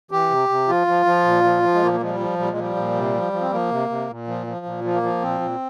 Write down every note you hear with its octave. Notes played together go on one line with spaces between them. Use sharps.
E3 G4
C3
C3
F3 F4
F3
F3
A#2
F3
F3
G#3
A#2 A#3
A#3
F3 G#3
G3
F3
A#2 G3
G#3
F3 G3
A#2
C3
F3
F3
C4
F3 A#3
C3
C3
A#2
F3
F3
A#2
F3
A#3
F3
A#2 C4
A#2